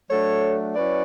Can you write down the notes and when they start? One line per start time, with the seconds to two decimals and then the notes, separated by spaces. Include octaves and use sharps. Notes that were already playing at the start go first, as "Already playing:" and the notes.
0.10 F#3 A3 D4 A4 C#5
0.76 F#3 C#4 E4 B4 D5